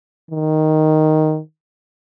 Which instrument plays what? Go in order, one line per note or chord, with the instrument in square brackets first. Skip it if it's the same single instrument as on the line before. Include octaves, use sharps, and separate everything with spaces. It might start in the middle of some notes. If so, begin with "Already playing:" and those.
[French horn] D#3